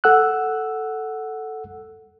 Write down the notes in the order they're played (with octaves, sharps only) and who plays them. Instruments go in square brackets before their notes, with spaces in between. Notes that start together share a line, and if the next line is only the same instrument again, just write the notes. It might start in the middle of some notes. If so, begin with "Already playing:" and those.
[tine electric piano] A4 F#5 E6 F#6